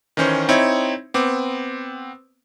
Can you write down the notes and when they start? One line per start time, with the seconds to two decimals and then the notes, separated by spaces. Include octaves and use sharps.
0.17 D#3 E3 C#4 C5
0.49 C4 D#4 E4 C#5
1.14 B3 C4 D6